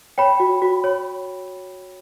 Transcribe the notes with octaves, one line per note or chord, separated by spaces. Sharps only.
C#5 G5 B5
F#4
F#4
C#5